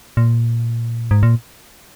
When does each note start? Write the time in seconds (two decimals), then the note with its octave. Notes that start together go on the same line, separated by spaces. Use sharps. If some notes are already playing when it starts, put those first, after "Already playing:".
0.17 A#2
1.11 G#2
1.23 A#2